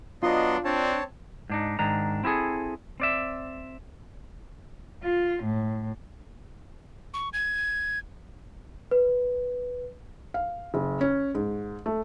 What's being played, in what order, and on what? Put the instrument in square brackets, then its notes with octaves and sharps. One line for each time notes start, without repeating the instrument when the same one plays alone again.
[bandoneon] F#3 B3 C6 [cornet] D4 [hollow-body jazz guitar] F4 [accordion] D#5
[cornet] C4 [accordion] D4 [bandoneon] C#5 A5
[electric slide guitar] G#2 D4 D#4
G#2 D#3 D4 A#5
C4 E4 F#4 G#4 A4
C4 D5 E5
[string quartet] F4
A2
[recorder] C#6
G#6
[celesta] B4
[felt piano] F5
F#1
C#4
G#2
A3